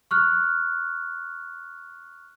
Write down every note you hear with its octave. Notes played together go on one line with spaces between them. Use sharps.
C#6 F6 F#6